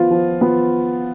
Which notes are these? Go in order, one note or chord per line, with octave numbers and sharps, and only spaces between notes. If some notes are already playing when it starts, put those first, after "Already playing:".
Already playing: F3 B3 F4
F3
B3 F4